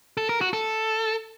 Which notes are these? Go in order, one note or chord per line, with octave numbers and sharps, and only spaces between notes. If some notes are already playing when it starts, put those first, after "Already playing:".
A4
A#4
F#4
A4